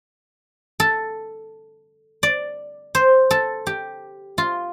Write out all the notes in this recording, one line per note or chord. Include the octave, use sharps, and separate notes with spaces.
A4
D5
C5
A4
G4
F4